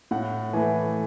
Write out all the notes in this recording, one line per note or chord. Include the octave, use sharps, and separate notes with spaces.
A2 F#5
E3 A3 G#5